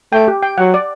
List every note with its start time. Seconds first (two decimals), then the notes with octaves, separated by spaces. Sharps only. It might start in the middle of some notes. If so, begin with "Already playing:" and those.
0.12 A3 G5
0.28 G4
0.43 G5
0.58 F#3 F#5
0.74 D5